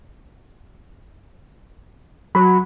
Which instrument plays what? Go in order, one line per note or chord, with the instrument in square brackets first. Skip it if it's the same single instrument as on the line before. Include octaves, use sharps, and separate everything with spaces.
[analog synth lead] F#3 [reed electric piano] B5